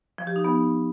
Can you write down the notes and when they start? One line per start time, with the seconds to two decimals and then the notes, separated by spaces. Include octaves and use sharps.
0.18 F3
0.27 G4
0.36 D#4
0.45 B3